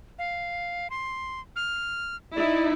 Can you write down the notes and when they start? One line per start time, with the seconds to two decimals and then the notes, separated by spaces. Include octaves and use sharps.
0.19 F5
0.90 C6
1.56 F6
2.35 D#4 E4 D5